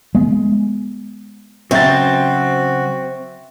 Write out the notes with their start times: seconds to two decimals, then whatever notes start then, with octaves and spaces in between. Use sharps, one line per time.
0.15 G#3 B3
1.71 C#3 F#3 C4 F#4 C5 E5 A6